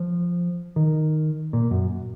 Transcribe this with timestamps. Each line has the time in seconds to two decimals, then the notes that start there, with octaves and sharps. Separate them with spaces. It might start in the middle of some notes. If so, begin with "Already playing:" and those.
Already playing: F3
0.76 D#3
1.53 A#2
1.71 F#2